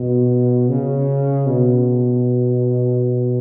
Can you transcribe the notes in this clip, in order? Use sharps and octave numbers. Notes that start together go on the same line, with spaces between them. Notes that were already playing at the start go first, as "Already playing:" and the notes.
Already playing: B2
C#3
B2